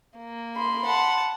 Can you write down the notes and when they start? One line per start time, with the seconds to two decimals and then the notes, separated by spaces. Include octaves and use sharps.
0.18 A#3
0.56 B5 C6
0.85 F#5 A5